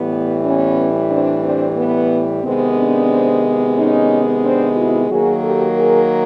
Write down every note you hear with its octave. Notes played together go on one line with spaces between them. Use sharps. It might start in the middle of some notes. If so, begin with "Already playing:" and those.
Already playing: A2 E3 G3 B3
B3 C#4
C4 D4
C4 D4
B3
C3 D#3 G#3 B3 C4
C4 D4
C#4 D#4
C4 D4
E4 F#4
D#3 F#3 A#3 F#4 G#4
G4 A4
G#4 A#4